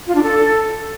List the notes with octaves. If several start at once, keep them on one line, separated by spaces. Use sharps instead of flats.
F4
D4
A4